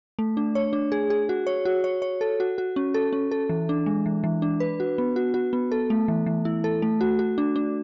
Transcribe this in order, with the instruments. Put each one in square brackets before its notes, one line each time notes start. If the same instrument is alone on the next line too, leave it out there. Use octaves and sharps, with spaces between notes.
[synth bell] A3
D4
C#5
D4
G#4
G#4
F#4
C#5
F#4
C#5
C#5
A4
F#4
F#4
C#4
A4
C#4
A4
E3
D4
G#3
E3
E3
D4
B4
F#4
B3
F#4
F#4
B3
A4
A3
E3
E3
E4
A4
A3
F#4
F#4
D4
D4